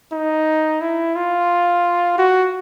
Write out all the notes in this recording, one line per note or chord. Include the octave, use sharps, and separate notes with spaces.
D#4
E4
F4
F#4